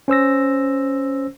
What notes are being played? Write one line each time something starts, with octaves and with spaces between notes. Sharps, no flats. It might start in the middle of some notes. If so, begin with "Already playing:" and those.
C#4 C5 E6 A#6